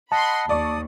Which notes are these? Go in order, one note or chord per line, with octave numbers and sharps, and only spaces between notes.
D#5 F#5 A5 B5 C6
D#2 D5 C#6 D#6